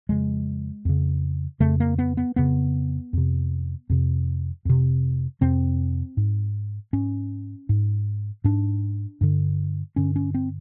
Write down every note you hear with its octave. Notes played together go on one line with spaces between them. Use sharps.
F2 C#3 G#3
F2 C#3
F2 C#3 A3
A#3
B3
B3
F2 C#3 B3
F2 C3
F2 C3
F2 C3
F2 C3 C4
G#2
G#2 C#4
G#2
G#2 D4
G2 D3
G2 D3 C#4
C#4
C4